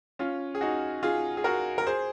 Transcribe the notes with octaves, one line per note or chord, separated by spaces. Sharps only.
C#4 F4
G#4
D#4 F#4
F4 G#4
G#4
F#4 A#4
A#4
G#4 C5